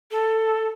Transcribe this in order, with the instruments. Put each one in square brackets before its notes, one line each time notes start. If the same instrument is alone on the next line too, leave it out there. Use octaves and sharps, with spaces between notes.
[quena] A4